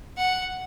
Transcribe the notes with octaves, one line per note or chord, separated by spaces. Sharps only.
F#5